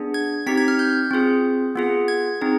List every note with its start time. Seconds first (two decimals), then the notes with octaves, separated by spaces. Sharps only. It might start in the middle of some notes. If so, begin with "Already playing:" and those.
Already playing: B3 D4 G#4
0.14 G#6
0.47 C4 D#4 G4 B6
0.57 G#6
0.68 F6
0.79 G6
1.11 C4 F4 G#4
1.76 B3 F4 G#4
2.08 G#6
2.41 C4 D#4 G#4